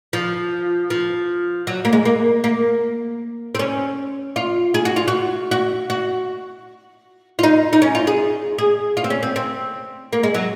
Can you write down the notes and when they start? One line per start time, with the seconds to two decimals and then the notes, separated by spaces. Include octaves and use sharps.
0.13 F3
0.90 F3
1.67 F#3
1.85 A#3
1.93 G#3
2.05 A#3
2.44 A#3
3.55 C4
3.59 C#4
4.36 F4
4.74 G#4
4.85 F#4
4.96 F4
5.08 F#4
5.51 F#4
5.90 F#4
7.39 F4
7.43 D#4
7.73 D#4
7.82 C#4
7.95 F4
8.07 G#4
8.58 G#4
8.97 F4
9.04 C4
9.10 C#4
9.23 C4
9.36 C4
10.13 A#3
10.23 G#3
10.34 F#3